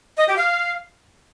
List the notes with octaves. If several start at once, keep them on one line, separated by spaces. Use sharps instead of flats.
D#5
G4
F5